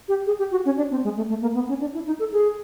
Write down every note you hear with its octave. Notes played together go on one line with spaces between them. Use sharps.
G4
G#4
G4
F#4
C#4
D4
C4
G#3
A3
A3
A#3
B3
C#4
D4
E4
D#4
A4
G#4